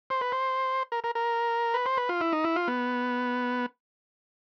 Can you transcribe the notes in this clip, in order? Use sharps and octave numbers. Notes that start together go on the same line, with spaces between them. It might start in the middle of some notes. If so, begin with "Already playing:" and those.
C5
B4
C5
A#4
A#4
A#4
B4
C5
B4
F4
E4
D#4
E4
F4
B3